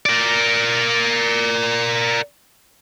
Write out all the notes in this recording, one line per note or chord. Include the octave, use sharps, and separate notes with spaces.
A#4 D5